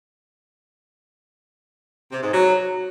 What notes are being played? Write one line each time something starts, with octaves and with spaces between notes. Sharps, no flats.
C3
G#2
F#3